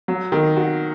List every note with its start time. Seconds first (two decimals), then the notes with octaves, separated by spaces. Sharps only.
0.08 F#3
0.32 D#3
0.57 F#4